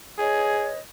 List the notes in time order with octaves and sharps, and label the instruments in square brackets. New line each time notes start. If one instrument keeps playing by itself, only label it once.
[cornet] G#4 [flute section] B4 C#5 D#5